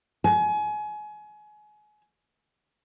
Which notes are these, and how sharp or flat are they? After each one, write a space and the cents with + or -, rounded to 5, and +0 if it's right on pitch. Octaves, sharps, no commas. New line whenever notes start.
G#5 +30